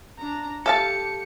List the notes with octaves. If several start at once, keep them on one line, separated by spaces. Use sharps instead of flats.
D4 A#5
G4 A4 F5 A5 C#7